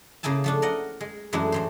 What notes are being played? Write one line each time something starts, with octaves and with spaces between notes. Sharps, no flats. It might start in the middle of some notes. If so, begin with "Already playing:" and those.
C#3 A#3 E4 G#5 A5
F3 A3 D4
A#4 D5 D#5 F#5
G#3
F#2 E3 G#3 A3 D4 E4
A2 E3 C5